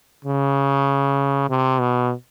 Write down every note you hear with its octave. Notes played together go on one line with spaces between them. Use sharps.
C#3
C3
B2